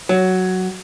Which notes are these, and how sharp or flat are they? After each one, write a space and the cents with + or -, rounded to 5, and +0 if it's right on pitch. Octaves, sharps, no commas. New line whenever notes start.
F#3 +5